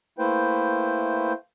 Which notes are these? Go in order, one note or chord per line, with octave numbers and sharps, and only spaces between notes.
A3 A#3 E4 B4 C5 G5